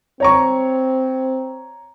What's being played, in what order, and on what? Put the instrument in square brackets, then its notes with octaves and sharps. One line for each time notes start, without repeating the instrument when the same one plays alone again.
[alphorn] C4 [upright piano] C#5 A#5 C#6